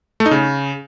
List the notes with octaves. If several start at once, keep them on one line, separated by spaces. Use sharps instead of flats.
A3
D#4
C#3